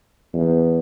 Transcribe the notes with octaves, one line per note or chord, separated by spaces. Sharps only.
E2